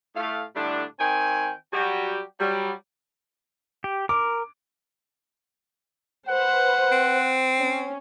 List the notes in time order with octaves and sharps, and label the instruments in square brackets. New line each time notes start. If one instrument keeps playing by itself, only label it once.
[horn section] A2 A3 F5
A2 D3 G3 D4
D#3 C4 G5 G#5
F#3 G3 F#4 G4
F#3 G3
[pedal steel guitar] G4
[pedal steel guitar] A#4 [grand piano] D6
[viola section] B4 C5 [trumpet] F#5
[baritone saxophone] C4
[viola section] C#4